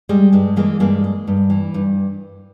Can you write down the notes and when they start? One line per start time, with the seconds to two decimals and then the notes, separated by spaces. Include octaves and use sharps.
0.09 G3 G#3
0.33 G2 G#3
0.56 E3 G#3 A#3
0.80 G2 G#3 A#3
1.04 G#3
1.27 G2
1.50 E3
1.74 G2